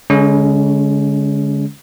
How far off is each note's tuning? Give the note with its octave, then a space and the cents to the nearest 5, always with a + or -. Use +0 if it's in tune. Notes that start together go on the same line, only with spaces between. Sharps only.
D3 -25 G#3 +0 C#4 +25